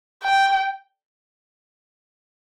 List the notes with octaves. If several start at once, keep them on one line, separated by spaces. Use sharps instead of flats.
G5